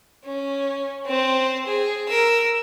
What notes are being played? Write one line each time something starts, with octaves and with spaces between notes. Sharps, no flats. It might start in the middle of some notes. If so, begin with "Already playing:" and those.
C#4
C4 C5
G#4
A#4 E6